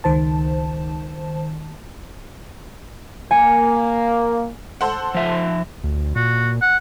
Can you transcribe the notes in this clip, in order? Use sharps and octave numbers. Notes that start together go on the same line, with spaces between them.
C#2 D#3 C5 A5
A#3 G#5 C#7
A4 C5 F#5
F3 E5
D2
A#2 F#4
F#5